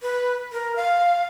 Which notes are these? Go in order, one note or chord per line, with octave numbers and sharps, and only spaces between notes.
B4
A#4
F5